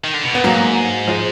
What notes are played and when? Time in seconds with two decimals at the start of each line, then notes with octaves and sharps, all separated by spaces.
0.04 D#3
0.14 D3
0.23 B2
0.34 A#2 B3
0.44 G#2 F#3 A#3
1.07 F3 G#3